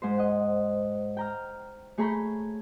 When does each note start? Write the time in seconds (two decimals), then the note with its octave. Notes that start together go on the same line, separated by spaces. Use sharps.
0.02 G#2 C5
0.18 D#5 F#5
1.17 G5 A#5 F6
1.98 A3 G#4 C#5 A#5 B5 G6